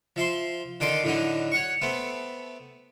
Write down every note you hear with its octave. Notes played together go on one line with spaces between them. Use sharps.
F3 E5 C6
D3 D#3 A4 C6 D6
A2 D3 F#3 D#4
C#5 F#5 C#6
A3 B3 C4